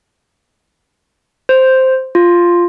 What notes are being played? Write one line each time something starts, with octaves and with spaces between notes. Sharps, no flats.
C5
F4